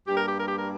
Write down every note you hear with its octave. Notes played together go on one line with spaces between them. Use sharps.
G2 G3 A#3 G4
A#4
G4
A#4
G4
A#4